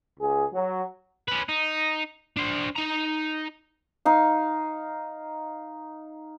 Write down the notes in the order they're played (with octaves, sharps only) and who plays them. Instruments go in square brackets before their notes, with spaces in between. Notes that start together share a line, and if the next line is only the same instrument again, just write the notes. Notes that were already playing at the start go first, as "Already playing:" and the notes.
[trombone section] C#2 G#4
F#3
[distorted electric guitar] C#4 B4
D#4
D4 C5
D#4 A#5
[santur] D#4 F5